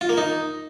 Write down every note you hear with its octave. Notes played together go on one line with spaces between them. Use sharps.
F4
A#3
D#4